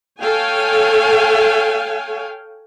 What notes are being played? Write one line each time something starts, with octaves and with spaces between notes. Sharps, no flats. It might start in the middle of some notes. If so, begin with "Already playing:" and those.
A4 C#5 F5 G5 G#5